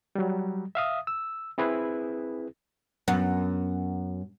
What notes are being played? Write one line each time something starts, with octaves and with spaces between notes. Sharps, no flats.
F#3 G3
E5 F5 D#6
E6
C4 E4 G#4 B4
F#2 B3